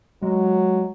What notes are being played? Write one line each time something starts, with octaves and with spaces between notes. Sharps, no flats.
F#3 G#3